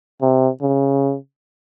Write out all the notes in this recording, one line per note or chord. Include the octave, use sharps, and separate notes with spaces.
C3
C#3